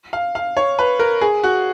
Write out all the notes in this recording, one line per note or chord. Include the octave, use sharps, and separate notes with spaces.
F5
F5
C#5
B4
A#4
G#4
F#4